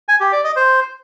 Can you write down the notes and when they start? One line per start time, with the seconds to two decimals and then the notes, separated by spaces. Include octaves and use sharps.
0.09 G#5
0.20 G4
0.32 D5
0.44 D#5
0.56 C5